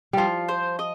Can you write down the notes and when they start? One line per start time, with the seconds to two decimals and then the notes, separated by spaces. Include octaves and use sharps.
0.13 F3 G3 F4
0.49 C5
0.79 D#5